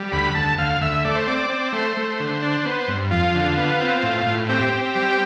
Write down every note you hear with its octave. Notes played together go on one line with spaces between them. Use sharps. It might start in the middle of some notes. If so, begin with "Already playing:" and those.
Already playing: G3
D2 B5
D2 A5
D2 F5
D2 E5
A3 D5
C5
C4 D5
C4
A3 C5
A3
D3
D4
B3
G2
F2 F4
D3
B3
C4
A2
A2
C4 G4
C4
G3